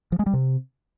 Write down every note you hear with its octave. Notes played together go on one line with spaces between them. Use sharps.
F3
G#3
G3
C3